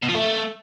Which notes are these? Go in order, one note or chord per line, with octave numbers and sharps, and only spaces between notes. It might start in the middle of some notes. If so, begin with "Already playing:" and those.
B2
F3
A3